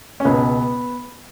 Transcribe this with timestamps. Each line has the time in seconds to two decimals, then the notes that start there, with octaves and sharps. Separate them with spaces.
0.20 C#4
0.25 C#2 B2 B3